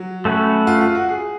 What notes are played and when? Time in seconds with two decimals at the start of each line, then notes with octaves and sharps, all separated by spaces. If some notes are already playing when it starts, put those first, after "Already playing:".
Already playing: F#3
0.25 A3 C#4 F#4 B4
0.67 F4
0.81 F4
0.95 F#4
1.09 G#4